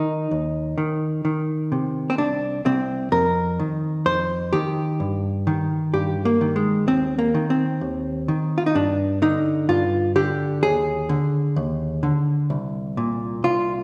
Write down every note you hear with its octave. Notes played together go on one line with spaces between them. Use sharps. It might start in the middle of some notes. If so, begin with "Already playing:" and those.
Already playing: D#3 D#4
D#2
D#3
D#3
C3
C4
C2 D4
C2 C4
F2 A#4
D#3
F2 C5
D#3 G4
G2
D#3
G2 G4
A#3
D#3
G#3
D#2 C4
A#3
D#3
C4
D#2
D#3
F4
D#4
G2 D4
D3 D#4
G2 F4
D3 G4
D#2 G#4
D3
D#2
D3
C2
A#2
C2 F4